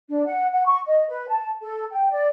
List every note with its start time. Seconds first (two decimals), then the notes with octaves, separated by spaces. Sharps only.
0.08 D4
0.26 F#5
0.53 F#5
0.66 C#6
0.86 D#5
1.08 B4
1.28 A5
1.62 A4
1.93 G5
2.10 D5